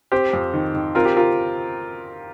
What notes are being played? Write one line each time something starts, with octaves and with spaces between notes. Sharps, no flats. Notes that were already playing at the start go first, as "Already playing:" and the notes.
C4 G4 C5
F2
D#3
D#3
C4 F4 A#4
G4
F4 A#4